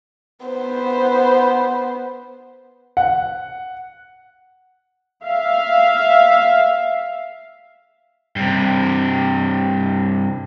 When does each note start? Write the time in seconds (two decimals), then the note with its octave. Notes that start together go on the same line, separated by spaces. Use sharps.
0.46 B3 C5
2.97 F#5
5.24 E5 F5
8.36 G2 C3